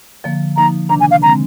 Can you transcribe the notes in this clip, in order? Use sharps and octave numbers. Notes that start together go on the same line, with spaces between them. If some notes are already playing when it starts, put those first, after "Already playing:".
D3 F3 A#3
F3 A#3 D#4 A#5
C3 D#3 A#3 D4 A#5
G#5
F5
D3 G#3 C4 A#5